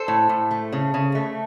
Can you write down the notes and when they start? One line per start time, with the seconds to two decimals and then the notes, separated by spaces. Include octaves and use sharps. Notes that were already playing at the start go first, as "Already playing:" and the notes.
Already playing: A4 C5
0.08 A2
0.29 A2
0.51 A3
0.72 C#3
0.94 C#3
1.15 A3